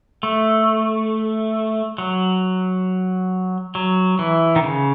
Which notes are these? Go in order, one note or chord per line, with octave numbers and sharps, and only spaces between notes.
A3
F#3
F#3
E3
D#3
C#3